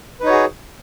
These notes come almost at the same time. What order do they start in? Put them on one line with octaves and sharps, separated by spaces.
B4 D#4 C#5 F#4 G#4